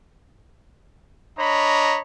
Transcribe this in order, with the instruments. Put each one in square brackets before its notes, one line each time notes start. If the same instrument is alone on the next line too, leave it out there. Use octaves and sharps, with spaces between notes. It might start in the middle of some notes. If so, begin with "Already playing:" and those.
[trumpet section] D4 C#5 D#5 A#5 B5